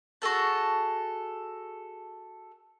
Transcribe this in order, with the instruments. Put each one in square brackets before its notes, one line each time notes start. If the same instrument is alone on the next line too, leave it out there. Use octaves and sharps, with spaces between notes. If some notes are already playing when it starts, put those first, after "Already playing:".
[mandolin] F#4 G#4 A4 A5